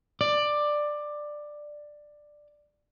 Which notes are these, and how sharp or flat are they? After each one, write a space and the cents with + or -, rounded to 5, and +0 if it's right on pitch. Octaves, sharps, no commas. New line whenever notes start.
D5 +10